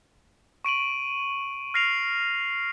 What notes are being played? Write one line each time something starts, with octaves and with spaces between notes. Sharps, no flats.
C#6 D7 D#7 F#7
F6 A#6 C7 D7 F7